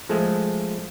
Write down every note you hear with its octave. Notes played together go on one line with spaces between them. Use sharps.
F3 G#3 A3